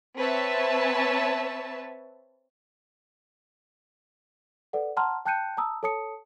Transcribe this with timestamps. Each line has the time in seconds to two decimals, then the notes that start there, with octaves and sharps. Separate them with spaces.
0.17 C4 B4 C#5 E5 A5
4.73 A4 B4 D5 F#5
4.97 F#5 A5 A#5 C6 F6
5.25 G5 A5 F#6 G6 C#7 D#7
5.57 A5 A#5 D#6 E6
5.83 A4 C#5 A5 D#6 C#7